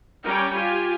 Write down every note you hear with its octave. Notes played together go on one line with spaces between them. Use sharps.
G3 C#4 A#4 C#5 G5
F4 G4 G#5